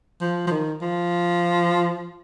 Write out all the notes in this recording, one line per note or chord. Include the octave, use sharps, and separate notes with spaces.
F3
F3
D#3
F3